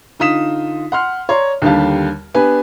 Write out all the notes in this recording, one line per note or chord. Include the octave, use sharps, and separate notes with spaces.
D3 D#4 F4 D#6 B6 E7
F#5 C6 F6
C#5 D5 A#5 C6
D#2 D3 G3 G4 F5 A5
B3 D4 G4 B4 G#5